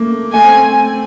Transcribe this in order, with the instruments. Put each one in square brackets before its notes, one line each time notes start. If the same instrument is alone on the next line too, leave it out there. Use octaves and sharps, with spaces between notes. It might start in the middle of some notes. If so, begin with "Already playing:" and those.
Already playing: [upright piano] A3 A#3
[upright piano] A3 [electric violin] G#5
[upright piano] C4